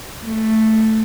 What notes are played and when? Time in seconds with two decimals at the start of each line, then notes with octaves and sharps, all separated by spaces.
0.24 A3